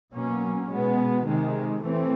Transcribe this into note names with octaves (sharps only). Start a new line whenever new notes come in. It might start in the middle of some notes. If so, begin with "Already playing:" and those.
B2 F#3 A#3 C#4
B2 G#3 B3
C3 D#3 G#3
E3 A3 C4